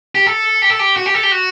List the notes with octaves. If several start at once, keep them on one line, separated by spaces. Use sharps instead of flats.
G4
A4
G4
A4
G4
F#4
G4
A4
G4
F#4